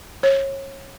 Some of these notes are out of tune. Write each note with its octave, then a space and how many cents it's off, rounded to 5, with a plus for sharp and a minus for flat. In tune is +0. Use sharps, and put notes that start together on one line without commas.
C#5 -25